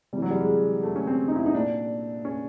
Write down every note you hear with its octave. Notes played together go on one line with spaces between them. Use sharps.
C3 E3 G3
F#3
G3
G#3
A3
C#4
C4
D#4
E4
D#4
A#2 D4
C#4